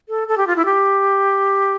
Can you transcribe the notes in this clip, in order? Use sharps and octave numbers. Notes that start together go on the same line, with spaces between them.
A4
A4
G4
F4
E4
G4